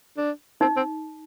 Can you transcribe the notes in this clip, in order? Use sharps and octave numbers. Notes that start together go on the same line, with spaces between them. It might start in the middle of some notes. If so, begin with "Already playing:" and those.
D4
C4 D#4
C4